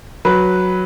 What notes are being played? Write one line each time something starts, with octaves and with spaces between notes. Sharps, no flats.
F#3 B4